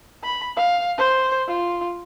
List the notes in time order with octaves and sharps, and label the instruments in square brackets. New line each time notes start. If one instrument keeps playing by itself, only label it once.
[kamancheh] B5
F5
C5
F4